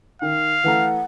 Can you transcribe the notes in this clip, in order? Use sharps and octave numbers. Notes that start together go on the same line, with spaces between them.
D#3 F5
E3 A3 F#5 A#5